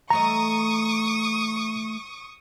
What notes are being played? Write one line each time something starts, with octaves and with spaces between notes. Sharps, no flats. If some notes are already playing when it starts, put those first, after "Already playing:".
E3 A3 D#5 A#5 C#6 D#6